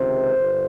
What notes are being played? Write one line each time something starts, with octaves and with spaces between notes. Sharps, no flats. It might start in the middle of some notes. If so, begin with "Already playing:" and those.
Already playing: C#2 C3 D#3 C5
G1